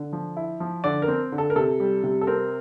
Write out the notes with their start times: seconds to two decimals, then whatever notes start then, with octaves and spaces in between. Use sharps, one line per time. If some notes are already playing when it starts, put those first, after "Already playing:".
Already playing: D3
0.13 F3
0.37 E4
0.60 F3
0.84 D3 D5
1.02 A#4
1.08 C4
1.32 D3
1.38 A4
1.50 A#4
1.56 C3 A4
1.80 G3
2.04 C3
2.21 A4
2.27 C4 A#4